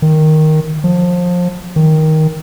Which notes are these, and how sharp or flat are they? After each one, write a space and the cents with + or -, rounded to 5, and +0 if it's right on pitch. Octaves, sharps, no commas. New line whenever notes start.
D#3 +0
F3 +25
D#3 +10